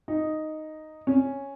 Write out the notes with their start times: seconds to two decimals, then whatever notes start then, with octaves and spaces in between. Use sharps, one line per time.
0.08 D#4
1.07 C#4